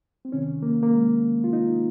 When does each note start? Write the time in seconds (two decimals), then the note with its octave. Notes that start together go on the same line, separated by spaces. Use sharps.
0.25 C4
0.32 C#2 C3 D#3 C#4
0.62 A#3
0.83 A#3
0.93 G#3
1.44 F4
1.53 D#4